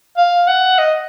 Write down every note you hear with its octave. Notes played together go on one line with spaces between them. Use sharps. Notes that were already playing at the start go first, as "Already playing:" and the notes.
F5
F#5
D#5